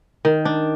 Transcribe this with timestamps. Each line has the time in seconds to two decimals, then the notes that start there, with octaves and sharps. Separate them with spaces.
0.25 D#3
0.45 D4